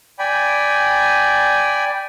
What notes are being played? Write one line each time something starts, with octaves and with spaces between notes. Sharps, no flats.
D5 G5 G#5 B5